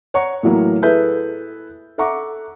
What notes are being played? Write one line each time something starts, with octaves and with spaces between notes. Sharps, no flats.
C#5 F#5 A#5 C#6
A2 E3 F#3 A#3
E4 G#4 A4 B4 E5 G6
A4 E5 F#5 A#5 C#6 D6